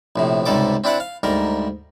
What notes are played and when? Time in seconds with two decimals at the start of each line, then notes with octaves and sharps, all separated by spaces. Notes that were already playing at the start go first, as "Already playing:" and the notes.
0.16 A#1 A2 C3
0.46 C#2 G#2 C3 G3 A4 D6
0.84 C4 D4 E4 D5 F#5
1.00 F5
1.23 D2 G#2 G3 A#4